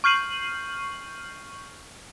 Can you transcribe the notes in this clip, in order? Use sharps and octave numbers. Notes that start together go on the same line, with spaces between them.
C#6 F6 G6 C7 D#7 F#7